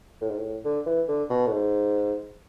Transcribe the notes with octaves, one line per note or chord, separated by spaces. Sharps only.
A2
G#2
A2
D3
E3
D3
B2
A2
G#2